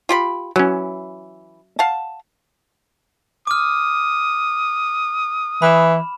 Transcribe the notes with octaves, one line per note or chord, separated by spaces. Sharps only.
F4 G4 B5
E3 F#3 C#4
F5 F#5 A5
D6 D#6 F6
E3 B5 E7